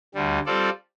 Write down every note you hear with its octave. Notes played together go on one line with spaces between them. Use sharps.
D2 D3 G3
G3 C4 F4 A4 D5